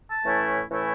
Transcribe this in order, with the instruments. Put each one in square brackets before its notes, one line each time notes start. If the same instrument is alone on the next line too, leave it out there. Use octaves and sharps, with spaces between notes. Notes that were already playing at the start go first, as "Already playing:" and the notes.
[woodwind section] A5
A2 E3 A3 C#4 E4
A2 E3 A3 C#4 E4